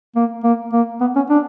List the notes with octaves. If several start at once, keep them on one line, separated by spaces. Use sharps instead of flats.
A#3
A#3
A#3
B3
C#4
D4